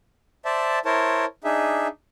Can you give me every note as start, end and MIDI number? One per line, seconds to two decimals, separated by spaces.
0.45 0.79 72
0.45 0.79 74
0.45 0.79 76
0.45 0.79 81
0.85 1.25 64
0.85 1.25 70
0.85 1.25 72
0.85 1.25 73
0.85 1.25 81
1.44 1.88 62
1.44 1.88 63
1.44 1.88 68
1.44 1.88 76